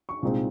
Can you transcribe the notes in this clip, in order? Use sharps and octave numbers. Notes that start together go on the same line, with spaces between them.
C#6
C2 A#2 G#3 C4 D#4